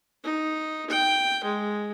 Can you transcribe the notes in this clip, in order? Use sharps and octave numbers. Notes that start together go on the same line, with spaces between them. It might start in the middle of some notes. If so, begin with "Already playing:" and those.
D#4
G5
G#3